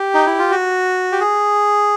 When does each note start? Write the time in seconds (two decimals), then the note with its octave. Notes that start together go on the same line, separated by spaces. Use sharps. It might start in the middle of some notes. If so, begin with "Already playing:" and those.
Already playing: G4
0.14 D#4
0.27 E4
0.39 F4
0.51 F#4
1.12 G4
1.20 G#4